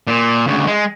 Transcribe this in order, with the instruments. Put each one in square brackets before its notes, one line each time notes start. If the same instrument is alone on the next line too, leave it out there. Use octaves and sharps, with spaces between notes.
[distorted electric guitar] A#2
D2 C#3
G#3